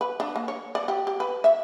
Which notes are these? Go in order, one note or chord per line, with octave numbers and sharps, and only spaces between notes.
B4
D4
A#3
C#5
D5
G4
G4
B4
E5